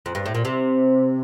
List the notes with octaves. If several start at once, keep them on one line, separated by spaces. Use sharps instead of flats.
F2
G2
A2
A#2
C3